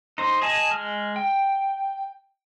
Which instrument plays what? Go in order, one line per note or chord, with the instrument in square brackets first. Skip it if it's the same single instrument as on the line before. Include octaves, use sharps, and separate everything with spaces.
[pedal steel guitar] D#4 C5
G#4 D#5 G#5 A5
G#3 F6
G5